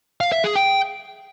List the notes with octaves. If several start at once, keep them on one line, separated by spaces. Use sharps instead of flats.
F5
E5
G#4
G5